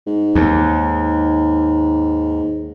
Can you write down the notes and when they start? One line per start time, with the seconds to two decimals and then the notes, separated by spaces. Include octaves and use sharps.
0.07 G#2
0.35 D#2